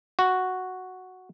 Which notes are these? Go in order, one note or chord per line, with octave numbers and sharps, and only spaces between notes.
F#4